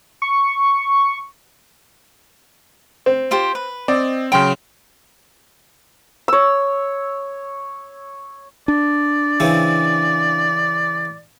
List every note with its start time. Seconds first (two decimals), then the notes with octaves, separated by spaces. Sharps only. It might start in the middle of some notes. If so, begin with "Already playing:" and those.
0.22 C#6
3.06 C4
3.31 F4 G4 C5
3.55 B4
3.88 C4 D5 D#5
4.32 C#3 F#3 C#4 G5 G#5 C6
6.28 C#5 E6
8.68 D4 D5
9.40 C#3 E3 C4